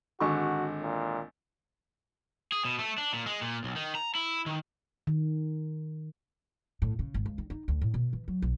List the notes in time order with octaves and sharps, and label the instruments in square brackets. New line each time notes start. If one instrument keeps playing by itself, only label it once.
[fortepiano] G#1 D3 C#6 [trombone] F#4
[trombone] A#2
[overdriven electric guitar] G#4
B2
A3
D4
A#2
G#3
A#2
B1
D#3
A#5
E4
D#3
[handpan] D#3
[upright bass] A2
C#3
G#1
C#2
D#3
D#4
D2
A2
B2
E3
F#3
B1